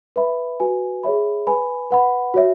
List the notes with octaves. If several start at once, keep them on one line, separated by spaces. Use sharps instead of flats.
B4 E5 B5
F#4 B4 G#5
G#4 C#5 E5 B5
B4 G#5 B5
B4 F#5 B5
F#4 C#5 E5